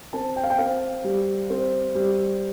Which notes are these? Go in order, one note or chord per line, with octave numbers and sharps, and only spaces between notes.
C4 A5
G5
F5
G5
C4 F5
G3
C4
G3